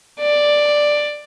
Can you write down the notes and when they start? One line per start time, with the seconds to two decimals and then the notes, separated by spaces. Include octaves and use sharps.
0.20 D5